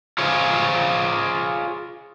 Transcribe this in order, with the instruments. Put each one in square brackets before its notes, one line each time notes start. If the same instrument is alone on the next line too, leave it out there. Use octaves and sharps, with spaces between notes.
[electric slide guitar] F4 G#4 C5 C#5